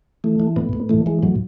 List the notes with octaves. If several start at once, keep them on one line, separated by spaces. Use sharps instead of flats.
E3 A3
E3
A2 B3
A2
E3 A3
E3 G#3
A2 F#3